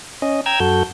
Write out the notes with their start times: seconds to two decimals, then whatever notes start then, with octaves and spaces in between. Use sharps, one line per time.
0.22 C#4 D#5
0.46 G5 A#5 E6 G#6
0.60 F#2 F#4 A4 G6